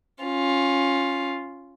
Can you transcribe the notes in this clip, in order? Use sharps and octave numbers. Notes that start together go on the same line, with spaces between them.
C#4 F4